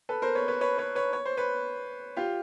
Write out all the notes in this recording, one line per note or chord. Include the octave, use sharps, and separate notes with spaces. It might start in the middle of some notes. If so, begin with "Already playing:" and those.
A4 B4
A#4 C5
B4 C#5
B4 C#5
B4 C#5
B4 C#5
B4 C#5
C#5
C5
B4 C#5
F4 G4